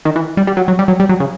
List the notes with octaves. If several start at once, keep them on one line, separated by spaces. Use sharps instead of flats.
D#3
E3
G3
G3
F#3
F#3
G3
F#3
G3
F#3
C#3